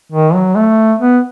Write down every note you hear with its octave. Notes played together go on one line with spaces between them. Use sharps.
D#3
F#3
A3
B3